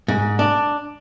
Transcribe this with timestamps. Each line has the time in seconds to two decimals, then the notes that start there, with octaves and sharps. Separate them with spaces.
0.08 G#2
0.39 D4